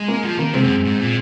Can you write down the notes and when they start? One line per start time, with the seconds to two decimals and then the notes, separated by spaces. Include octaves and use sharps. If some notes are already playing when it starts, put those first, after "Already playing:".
Already playing: G#3
0.08 A#3
0.24 F3
0.39 D#3 A#3
0.53 C3 G#3 C4
0.63 F#2
0.84 G#2
0.99 A#2